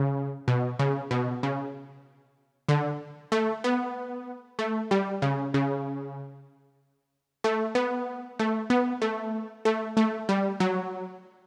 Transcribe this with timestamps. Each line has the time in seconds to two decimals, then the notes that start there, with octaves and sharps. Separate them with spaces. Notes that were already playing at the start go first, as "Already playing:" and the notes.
Already playing: C#3
0.48 B2
0.79 C#3
1.11 B2
1.43 C#3
2.69 D3
3.32 A3
3.64 B3
4.59 A3
4.91 G3
5.22 C#3
5.54 C#3
7.44 A3
7.75 B3
8.39 A3
8.70 B3
9.02 A3
9.65 A3
9.97 A3
10.29 G3
10.60 F#3